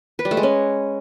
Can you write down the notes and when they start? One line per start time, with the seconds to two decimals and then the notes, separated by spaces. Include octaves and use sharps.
0.19 B4
0.25 G3
0.31 A3
0.37 G#3
0.43 C#4